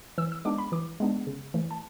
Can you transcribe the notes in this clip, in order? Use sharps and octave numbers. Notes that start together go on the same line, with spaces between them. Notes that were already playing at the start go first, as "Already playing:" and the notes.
E3 E6
E6
G#3 B3 D4 D6
B5
E3 D6
G#3 B3 D4
C#3
E3 A3
A5